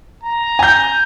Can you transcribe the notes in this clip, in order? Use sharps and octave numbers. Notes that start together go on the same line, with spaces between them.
A#5
G#5 G6